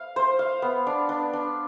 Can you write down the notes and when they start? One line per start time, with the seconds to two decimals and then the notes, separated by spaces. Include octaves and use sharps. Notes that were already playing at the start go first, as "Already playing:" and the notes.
Already playing: F5
0.16 C5
0.39 F5
0.62 B3
0.87 D4
1.09 D4
1.33 D4